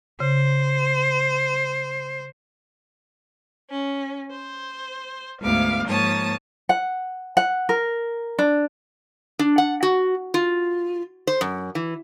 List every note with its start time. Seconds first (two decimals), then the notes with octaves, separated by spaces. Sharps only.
0.20 C#3 C5
3.70 C#4
4.31 C5
5.40 D2 G#2 B3 F5 D6
5.87 G#2 F3 A#3 C#5 A5 D#6
6.69 F#5
7.37 F#5
7.69 A#4
8.39 D4
9.39 D4
9.58 F#5
9.83 F#4
10.34 F4
11.27 C5
11.41 F#2
11.75 E3